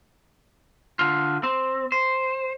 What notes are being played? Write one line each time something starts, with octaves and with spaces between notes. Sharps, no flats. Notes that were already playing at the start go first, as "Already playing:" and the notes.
D3 F4
C4
C5